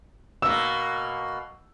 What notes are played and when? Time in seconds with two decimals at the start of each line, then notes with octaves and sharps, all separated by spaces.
0.42 B2 A#3 E6